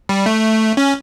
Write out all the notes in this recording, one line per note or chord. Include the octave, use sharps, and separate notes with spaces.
G3
A3
C#4